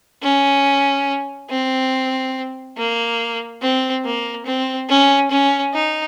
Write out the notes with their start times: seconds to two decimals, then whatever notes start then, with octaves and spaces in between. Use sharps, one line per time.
0.23 C#4
1.50 C4
2.77 A#3
3.62 C4
4.05 A#3
4.46 C4
4.89 C#4
5.31 C#4
5.74 D#4